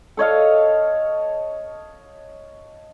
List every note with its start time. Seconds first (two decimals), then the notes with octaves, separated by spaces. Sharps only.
0.17 A4 C#5 D#5 F5